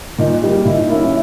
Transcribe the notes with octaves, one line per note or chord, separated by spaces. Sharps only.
A#2 D#4
G3 A#3 D#4
A#2 E4
D#4
A#3 C#4 E4
E4